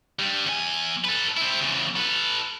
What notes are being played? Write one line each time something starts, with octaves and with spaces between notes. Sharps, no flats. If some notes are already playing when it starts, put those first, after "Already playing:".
G2 G3
E2 G#5
A4 B4
C4 E4
E2 C#3
A4 B4